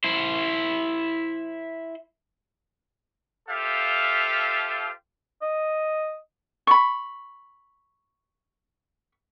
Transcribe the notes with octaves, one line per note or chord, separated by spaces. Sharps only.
E4 C5
F4 G4 A4 C5 E5 F5
D#5
B5 C#6